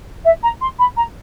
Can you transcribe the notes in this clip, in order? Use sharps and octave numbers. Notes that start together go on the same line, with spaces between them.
E5
A#5
C6
B5
A#5